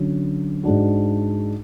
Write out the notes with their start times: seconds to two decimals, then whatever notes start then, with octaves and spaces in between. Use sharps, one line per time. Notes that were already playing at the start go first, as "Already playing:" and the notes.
Already playing: D3 F#3 C#4
0.64 G#2 G#3 D4 F#4